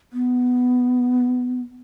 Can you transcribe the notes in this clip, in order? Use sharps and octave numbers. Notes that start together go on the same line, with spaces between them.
B3